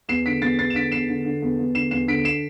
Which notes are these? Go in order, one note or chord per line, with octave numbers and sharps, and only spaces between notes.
E2 C7 E7
D3 B6 D7
E2 A6 C7
E2 A6 C7
E7
D3 B6 D7
E2 C7 E7
D3
D3
E2
E2
D3 C7 E7
E2 C7 E7
D3 B6 D7
C7 E7